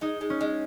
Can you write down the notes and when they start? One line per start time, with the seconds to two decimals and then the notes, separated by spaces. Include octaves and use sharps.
0.01 G#3 D#4
0.21 G#3
0.30 C#4
0.41 G#3